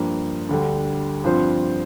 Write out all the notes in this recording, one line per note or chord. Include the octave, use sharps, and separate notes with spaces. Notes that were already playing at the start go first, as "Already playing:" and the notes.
Already playing: G2 F3 A#3
D2 D3 G3
G2 F3 C4 F4 C5